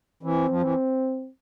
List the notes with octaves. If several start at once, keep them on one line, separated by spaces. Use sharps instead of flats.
E3 C4
F3
E3